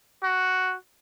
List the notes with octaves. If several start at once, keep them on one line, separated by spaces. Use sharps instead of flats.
F#4